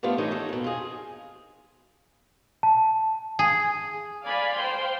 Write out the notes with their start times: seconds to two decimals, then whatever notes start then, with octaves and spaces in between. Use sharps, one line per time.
0.03 G3 A3 B3 D4 F4
0.18 E3 A3 D#4 A#4 C#5 D5
0.31 D#4 A4 C#5
0.49 F2 B2
0.64 F4 G#4
2.63 A5
3.39 G#4
4.24 D5 F5 G#5 B5
4.56 C5 F5 G5 C6